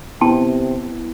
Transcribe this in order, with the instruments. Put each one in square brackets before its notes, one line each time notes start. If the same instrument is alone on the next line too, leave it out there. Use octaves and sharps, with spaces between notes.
[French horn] C3 [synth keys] B3 E4 [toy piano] G5 A5 C6